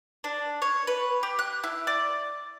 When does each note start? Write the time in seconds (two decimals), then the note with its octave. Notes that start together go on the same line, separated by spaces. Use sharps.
0.24 D4
0.62 C#5
0.87 B4
1.23 G4
1.39 F#6
1.64 E4
1.87 D5